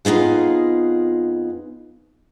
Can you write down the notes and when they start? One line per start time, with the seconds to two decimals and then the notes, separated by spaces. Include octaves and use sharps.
0.05 F2 B3 D#4 F4 G#4